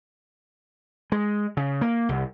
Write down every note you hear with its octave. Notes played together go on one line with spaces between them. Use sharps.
G#3
C#3
A#3
C2